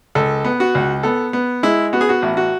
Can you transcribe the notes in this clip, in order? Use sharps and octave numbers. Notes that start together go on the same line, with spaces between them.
C#2 A4
B3
F#4
C#2
B3 A4
B3
G#3 E4
B3 F#4
G#4
F#4
A1
F#4